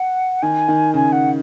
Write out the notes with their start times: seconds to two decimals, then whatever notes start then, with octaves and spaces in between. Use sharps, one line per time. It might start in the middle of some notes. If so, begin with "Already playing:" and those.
Already playing: F#5
0.42 D#3 G#5
0.68 D#3
0.94 C#3 G#5
1.12 F#5